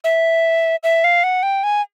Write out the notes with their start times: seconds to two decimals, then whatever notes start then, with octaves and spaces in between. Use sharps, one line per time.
0.04 E5
0.83 E5
1.04 F5
1.24 F#5
1.43 G5
1.64 G#5